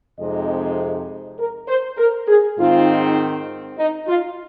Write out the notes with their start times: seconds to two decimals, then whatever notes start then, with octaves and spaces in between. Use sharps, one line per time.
0.18 F2 C3 G#3 D#4 D#5
1.38 A#4
1.67 C5
1.97 A#4
2.27 G#4
2.57 G#2 D#3 C4 D#4 F4
3.77 D#4
4.07 F4